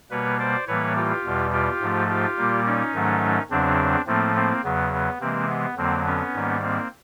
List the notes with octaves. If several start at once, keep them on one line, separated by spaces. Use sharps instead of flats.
B2 G3 A#3 B4 C#5
C5 D5
A2 E3 G3 A#3 B4 C#5
F4 G4
E2 B2 G3
F4 G4
G#2 F3 A3
F4 G4
A#2 G3 A#3
C#4 D#4
G#2 D#3 F#3 A3
E2 C#3 F#3 C4 D4
A2 F3 A3 A#3 C4
A#3 C4
E2 C#3 F#3 B3
B3
C3 E3 G#3 A#3 C4
B3
F2 D3 F#3 A#3 C4
B3 C#4
G#2 D#3 G3 A#3
A#3 C4